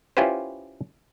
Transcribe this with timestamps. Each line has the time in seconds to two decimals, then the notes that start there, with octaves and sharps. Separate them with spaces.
0.17 C#4 E4 F4 G4 B4 C5